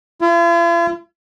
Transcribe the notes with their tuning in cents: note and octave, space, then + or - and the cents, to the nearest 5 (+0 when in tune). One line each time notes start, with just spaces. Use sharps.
F4 -45